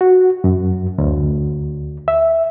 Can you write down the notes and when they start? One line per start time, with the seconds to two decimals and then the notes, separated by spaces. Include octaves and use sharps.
0.01 F#4
0.44 F#2
0.98 D2
2.08 E5